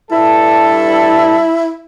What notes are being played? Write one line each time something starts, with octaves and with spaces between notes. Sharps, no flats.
G2 E4 A4